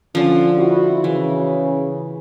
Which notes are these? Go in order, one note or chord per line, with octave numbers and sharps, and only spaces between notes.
D3 F3 C#4
E4 F#4
C#3 E3